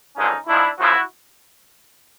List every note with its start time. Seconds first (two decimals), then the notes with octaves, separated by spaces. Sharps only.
0.15 G#1 G2 D3 F3 G#3 C#4 D#4
0.46 G#2 F3 A3 D4 E4
0.78 F#2 C#3 F3 E4 F#4